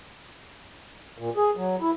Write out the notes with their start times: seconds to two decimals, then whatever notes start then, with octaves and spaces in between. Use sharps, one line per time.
1.18 A#2
1.37 G#4
1.56 F#3
1.81 E4